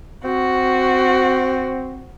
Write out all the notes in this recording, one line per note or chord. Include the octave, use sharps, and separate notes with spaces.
C4 F#4